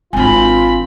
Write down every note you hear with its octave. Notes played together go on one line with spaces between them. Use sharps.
G#1 C4 D4 F4 G#5 B5